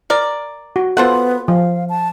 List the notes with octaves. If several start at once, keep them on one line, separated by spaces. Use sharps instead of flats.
A#4 D5
F#4
B3 F4 A4 C5 F#5
F3 F5
A5